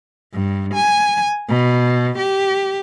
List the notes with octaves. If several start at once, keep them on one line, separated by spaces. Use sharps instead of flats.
G2
G#5
B2
G4